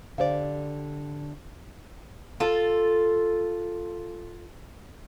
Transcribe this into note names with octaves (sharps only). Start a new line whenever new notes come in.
D3 G4 C5 D5 F5
F4 A4